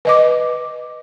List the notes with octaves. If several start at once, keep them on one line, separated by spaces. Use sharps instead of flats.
B4 D#5 D6